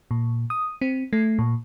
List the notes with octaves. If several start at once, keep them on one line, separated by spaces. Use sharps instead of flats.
A#2
D#6
C4
A3
A#2